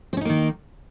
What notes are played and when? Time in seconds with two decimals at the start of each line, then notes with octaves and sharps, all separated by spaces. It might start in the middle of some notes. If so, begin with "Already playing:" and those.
0.13 C4
0.17 C#4
0.21 D#4
0.25 A#3
0.29 D#3